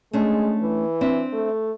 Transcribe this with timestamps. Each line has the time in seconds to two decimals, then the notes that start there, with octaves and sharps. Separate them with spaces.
0.13 G#3 A3 C#4 D4
0.62 E3
1.01 C4 D4 E5
1.33 A3